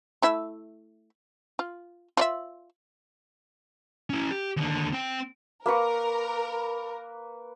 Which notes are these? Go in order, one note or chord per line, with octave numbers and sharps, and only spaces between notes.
A3 E4 E5
F4
F4 D5 E5
C#4 E4
G4
D#2 D3
C4 G5
A#3 A#4 B4 C#6